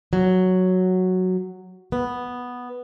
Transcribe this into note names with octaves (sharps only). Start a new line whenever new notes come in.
F#3
B3